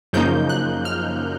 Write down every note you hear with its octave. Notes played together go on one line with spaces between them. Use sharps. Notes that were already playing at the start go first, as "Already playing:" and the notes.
F#2 C#3 F3 A#3 D#4 G6
F#6
F6